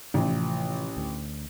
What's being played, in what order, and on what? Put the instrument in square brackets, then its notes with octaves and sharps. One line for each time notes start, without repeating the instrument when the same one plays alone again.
[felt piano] A1 [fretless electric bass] C3 E3 F3
[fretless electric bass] D2